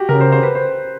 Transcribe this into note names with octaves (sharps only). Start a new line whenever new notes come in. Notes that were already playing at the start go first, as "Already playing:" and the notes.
Already playing: F#4 G4
C#3 A#4
C5
C5
B4
C5